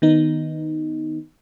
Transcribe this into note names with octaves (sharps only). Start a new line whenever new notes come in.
D#3 B3 D#4